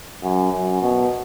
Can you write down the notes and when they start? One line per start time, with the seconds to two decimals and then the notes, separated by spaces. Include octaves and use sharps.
0.23 F#2
0.52 F#2
0.82 B2